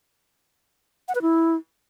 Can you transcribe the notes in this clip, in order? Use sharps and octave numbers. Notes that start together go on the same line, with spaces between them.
F#5
B4
E4